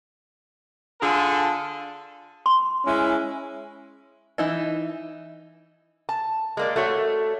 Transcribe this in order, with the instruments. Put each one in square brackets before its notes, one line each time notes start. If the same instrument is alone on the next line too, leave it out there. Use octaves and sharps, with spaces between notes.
[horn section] D3 F4 G#4 A4
[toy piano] C6
[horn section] G#3 C#4 E4
[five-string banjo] E3 D#4 E4
[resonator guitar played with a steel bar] A5
G#3 A#3 D5
A3 F#4 C#5